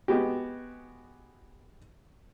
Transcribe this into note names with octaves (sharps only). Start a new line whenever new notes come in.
G#3 B3 F#4 G4